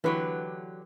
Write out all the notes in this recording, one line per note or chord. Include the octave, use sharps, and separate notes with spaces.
D3 E3 F#3 G4 B4